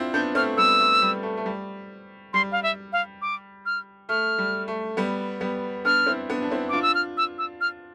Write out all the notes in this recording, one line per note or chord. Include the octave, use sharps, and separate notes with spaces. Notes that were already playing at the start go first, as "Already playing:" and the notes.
Already playing: C4 D4 E4 F4
B3 D4 G6
A3 C4 F6
G3 B3 E6
A3
G3
A3
A3
G3
G3 C6
F5
E5
F5
D6
F6
A3 F6
G3
A3
G3 B3
G3 B3
B3 D4 F6
C4 E4
B3 D4
D4
C4 E4
D4 F4 D6
E6
F6
E6
E6
F6